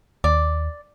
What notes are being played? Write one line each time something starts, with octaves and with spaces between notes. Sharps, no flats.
D#2 D5